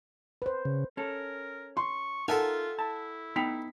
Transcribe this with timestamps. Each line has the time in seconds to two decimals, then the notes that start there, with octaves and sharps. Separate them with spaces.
0.42 B4 C5
0.65 C#3
0.97 C#4 A4 A#4
1.77 C6 C#6
2.28 D#4 F4 A4 A#4 E5 F#5 G#5 A5
2.79 E4 A5
3.36 B3 D#4 G5 B6